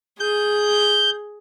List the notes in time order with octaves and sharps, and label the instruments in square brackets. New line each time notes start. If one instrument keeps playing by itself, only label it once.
[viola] G#4 [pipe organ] G6